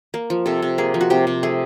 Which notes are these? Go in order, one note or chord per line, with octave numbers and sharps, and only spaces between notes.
A#3
F3
C3 A4
C3
A#3 G#4
F3
F#4
C3 G4
C3
A3 G#4